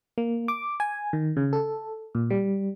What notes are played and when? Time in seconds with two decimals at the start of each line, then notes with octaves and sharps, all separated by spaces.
0.18 A#3
0.48 D6
0.80 G#5
1.13 D#3
1.37 C#3
1.53 A4
2.15 A#2
2.30 G3